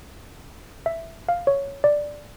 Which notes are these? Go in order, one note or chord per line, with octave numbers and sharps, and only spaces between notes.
E5
F5
C#5
D5